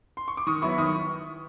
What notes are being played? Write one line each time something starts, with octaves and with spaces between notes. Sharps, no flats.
C6
C#6
D6
D#3 C#6 D#6
F#3 B3 E4 B5 C#6
D#3 C#6 D#6